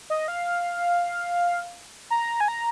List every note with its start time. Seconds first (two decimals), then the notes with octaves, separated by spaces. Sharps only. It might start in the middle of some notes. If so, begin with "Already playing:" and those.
0.10 D#5
0.28 F5
2.10 A#5
2.40 G#5
2.48 A#5